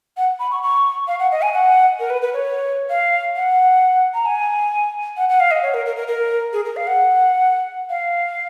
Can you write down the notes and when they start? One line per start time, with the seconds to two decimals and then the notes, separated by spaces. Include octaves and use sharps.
0.17 F#5
0.40 B5
0.51 C#6
0.63 C#6
1.07 F5
1.19 F#5
1.31 D#5
1.42 G#5
1.54 F#5
2.00 A#4
2.10 B4
2.22 B4
2.33 C#5
2.90 F5
3.36 F#5
4.14 A#5
4.26 G#5
5.17 F#5
5.29 F#5
5.40 F5
5.51 D#5
5.63 C#5
5.74 A#4
5.86 A#4
5.96 A#4
6.08 A#4
6.53 G#4
6.65 A#4
6.76 F5
6.87 F#5
7.90 F5